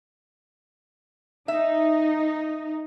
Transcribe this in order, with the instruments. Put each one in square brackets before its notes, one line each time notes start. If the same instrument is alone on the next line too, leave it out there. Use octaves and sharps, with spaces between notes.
[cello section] D#4 [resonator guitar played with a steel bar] E5